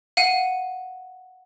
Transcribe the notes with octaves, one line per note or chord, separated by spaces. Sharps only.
F5 F#5 D#7